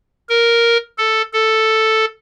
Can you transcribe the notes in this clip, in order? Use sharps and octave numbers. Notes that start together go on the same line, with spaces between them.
A#4
A4
A4